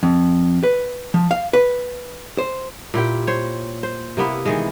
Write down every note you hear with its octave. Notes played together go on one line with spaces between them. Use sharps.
F2
B4
F3
F5
B4
C5
A#2 E4 G4 G5
C5 C#5
C5
C3 A#3 B3 E4
D#3 E3 G#3